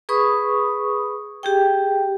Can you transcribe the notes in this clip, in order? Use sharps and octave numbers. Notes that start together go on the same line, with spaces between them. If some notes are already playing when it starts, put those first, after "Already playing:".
G#4 B4 B5 C#6 D#6
G4 G#4 G5